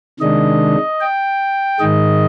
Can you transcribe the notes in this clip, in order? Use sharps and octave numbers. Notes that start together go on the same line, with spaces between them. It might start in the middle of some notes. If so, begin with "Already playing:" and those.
C3 D#3 G#3 D4 D#5
G5
G#2 D#3 G#3 D#5